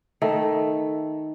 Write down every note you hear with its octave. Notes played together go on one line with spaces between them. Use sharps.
D#3 A3